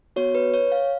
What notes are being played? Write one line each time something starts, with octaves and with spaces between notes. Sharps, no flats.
B3 F#4 C#5
B4
C#5
F5